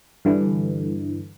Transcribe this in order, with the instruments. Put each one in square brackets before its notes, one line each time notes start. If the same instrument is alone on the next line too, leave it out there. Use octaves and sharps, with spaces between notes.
[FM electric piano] G2 D3 E3